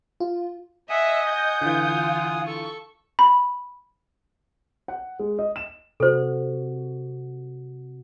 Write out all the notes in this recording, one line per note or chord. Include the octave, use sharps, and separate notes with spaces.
F4
D#5 E5 F#5 G#5 D#6
G6
D3 E3 F4
A4 C#6
B5
F#5
G#3
D#5
E7
C3 F#4 A4 C5